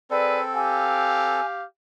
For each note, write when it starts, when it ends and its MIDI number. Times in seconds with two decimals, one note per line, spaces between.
0.11 1.41 60
0.11 0.44 68
0.11 1.41 69
0.11 0.44 71
0.11 0.38 74
0.55 1.64 67
0.55 1.64 77
0.55 1.46 80